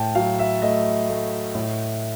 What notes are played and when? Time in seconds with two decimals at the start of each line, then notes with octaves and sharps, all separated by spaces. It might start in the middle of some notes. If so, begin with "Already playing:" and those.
Already playing: A2 G5 A5
0.15 F#3 F5
0.39 E5
0.62 A3 D#5
1.09 A3
1.55 A2